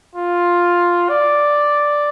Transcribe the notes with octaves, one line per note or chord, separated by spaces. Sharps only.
F4
D5